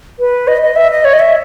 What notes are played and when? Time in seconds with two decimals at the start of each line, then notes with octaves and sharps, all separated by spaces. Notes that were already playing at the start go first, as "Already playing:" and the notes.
0.19 B4
0.48 D#5
0.62 D#5
0.76 E5
0.91 D#5
1.05 C#5
1.13 D#5
1.19 E5